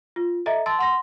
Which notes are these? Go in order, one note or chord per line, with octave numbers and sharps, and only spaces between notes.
F4
A4 D#5 E5 A#5
A5 C6 E6 A6
F#5 C6 A#6